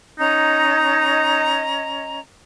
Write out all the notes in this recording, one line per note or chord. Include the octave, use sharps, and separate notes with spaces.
C#4 D#4 D#5 A#5